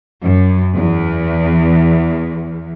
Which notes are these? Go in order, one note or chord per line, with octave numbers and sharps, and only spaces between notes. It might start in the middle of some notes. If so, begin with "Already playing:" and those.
F#2
E2